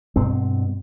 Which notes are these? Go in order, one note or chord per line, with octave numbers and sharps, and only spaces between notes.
G2 B2 C4